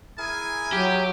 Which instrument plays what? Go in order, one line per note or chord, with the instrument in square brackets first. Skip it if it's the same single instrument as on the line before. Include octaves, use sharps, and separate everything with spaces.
[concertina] E4 G#4 A#4 [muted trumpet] G#5
[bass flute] F#3 [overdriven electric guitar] G4